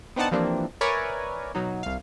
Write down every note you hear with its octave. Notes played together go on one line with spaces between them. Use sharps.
B3 C4 D4 D#4 F#5 A5
E3 F3 G3 A#3 C4 D4
A#4 B4 C#5 D5 E5 G#5
B2 F#3 D#4
C2 F5